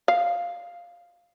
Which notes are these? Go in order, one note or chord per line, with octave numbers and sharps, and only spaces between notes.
F5